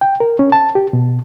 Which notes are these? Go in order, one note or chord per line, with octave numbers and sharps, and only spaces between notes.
G5
A#4
C#4
A5
G4
B2